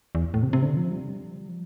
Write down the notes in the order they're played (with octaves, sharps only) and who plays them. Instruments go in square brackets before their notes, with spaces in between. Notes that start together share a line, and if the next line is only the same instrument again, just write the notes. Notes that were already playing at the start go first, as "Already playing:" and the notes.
[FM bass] E2
A2
C3
C3
D3
F3
G3
F3